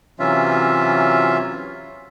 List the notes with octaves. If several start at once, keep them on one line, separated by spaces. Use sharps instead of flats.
C3 E3 F#3 C#4 F4 E5